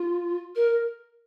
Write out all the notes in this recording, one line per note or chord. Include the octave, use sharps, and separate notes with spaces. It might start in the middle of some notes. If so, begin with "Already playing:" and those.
Already playing: F4
A#4